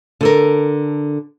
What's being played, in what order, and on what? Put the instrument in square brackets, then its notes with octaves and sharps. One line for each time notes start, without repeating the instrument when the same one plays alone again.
[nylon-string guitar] D3 A4 A#4